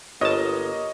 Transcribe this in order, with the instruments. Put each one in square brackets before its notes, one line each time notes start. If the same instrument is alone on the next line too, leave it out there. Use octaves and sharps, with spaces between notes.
[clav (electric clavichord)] G1 A5 [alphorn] A#3 [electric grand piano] C#5 D#5